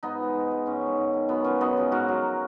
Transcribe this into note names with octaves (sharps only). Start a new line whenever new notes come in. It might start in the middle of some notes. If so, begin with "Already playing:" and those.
G#2 B3 D#4
F3 G#3
G#2
F3 G#3
G#2 C#4
D#3 G#3
G#2
D#3 G#3
F#2 B3
C#3 F3 G#3 C#4
F#2 B3 D#4
C#3 F3 G#3
G#2 F#4 A#4
F#3